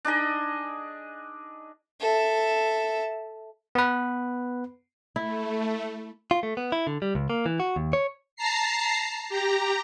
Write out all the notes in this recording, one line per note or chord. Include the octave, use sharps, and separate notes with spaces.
D4 D#4 G#4 D#5
A4 E5
B3 B4
A3 E4
F4
A3
B3
E4
D3
G3
C#2
A#3
E3
F#4
D#2
C#5
A5 A#5 C7
G4 A#5